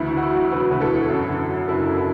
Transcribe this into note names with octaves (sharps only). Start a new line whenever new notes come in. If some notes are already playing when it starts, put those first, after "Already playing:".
Already playing: D2 E3 E4
D3 F#4
E4
F#3
E1 F#4 B4
D2 B4
E4 A4
D3
F#2
D3
F#3
F#1 E4 A4
F#2
E4